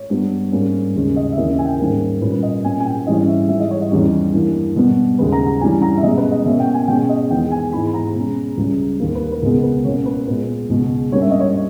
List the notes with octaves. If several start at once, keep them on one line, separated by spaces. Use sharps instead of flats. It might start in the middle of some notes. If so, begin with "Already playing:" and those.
Already playing: C#5
G2 G3 B3
G#2 G3 A#3 C#4
D#2 C#3 G#3 C#4
D#5
E5
D#2 C#3 E3 A#3 C#4 D#5
E5
G#5
G5
G#2 D#3 G3 A#3 C#4 A#4
A#2 G3 A#3 C#4 B4
B4
D#5
A#2 A#3 C#4 G#5
G#5
G5
G#2 E3 G3 C#4 D#5
E5
G#2 E3 G3 E5
D#5
C#5
D#5
E2 D#3 G3 C#4
G2 E3 A#3
B2 G3 B3
D#2 C#3 G#3 B4
A#5
A#5
G2 E3 G3 C#4 G#5
A#5
E5
B2 G#3 C#4 D#5
B4
D#5
B2 A#3 C#4 E5
G5
G#5
B2 G#3 C#4 G5
D#5
E2 D#3 G#3 B3 G5
G#5
G#2 E3 G#3 B3 B5
B5
A#5
B2 G#3 C#4
C#2 C#3 G3
D#2 D#3 A#3
B4
A#4
B4
C#2 B2 G#3 B3 A#4
B4
B2 A#3 C#4 C#5
B4
A#2 G#3 B3 B4
C#2 B2 G#3
G2 G3 A#3 C#4 C#5
E5
D#5
C#5